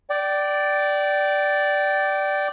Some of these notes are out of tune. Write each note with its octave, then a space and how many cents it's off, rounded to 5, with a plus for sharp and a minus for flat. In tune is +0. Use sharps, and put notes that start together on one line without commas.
D5 +0 G5 -25